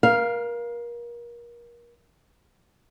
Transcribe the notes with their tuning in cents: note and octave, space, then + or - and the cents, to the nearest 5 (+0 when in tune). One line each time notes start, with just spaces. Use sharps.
A#4 +30 F5 +0